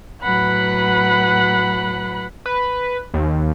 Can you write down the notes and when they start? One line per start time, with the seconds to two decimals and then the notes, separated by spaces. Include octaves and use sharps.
0.23 A2 F#3 B4 F#5 B5 F#6
2.46 B4
3.14 D#2